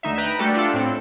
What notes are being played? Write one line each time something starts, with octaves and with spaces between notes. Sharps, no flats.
D2 D#4 E5
B4 G5 A#5
G3 A3 D4 F#4 G4 A4
D4 F4 A4
A2 C4